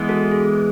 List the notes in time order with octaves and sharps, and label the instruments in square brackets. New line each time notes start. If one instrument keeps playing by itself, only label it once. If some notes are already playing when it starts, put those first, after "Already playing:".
Already playing: [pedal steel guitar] E3 G#3 B3
[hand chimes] F#4 A4
G#4